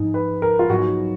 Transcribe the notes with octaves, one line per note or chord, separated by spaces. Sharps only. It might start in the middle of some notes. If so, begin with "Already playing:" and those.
Already playing: G#2 F3 G#3 D#4
B4
A#4
F4
G#2 F#3 B3 F#4